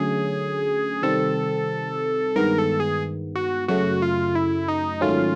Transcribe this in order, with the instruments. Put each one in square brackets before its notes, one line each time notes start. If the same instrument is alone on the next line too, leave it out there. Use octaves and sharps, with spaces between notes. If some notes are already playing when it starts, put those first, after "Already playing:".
Already playing: [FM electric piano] D3 F#3 A3 C#4 [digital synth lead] G#4
[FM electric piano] C3 D#3 G3 C4 [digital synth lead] A4
[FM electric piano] G2 D#3 G#3 B3 [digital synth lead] A#4
[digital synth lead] A4
G#4
F#4
[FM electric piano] F#2 C#3 F#3 A3 [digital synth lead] F#4
[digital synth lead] F4
E4
D#4
[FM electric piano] G#2 D#3 F#3 A3 C#4 [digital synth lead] F4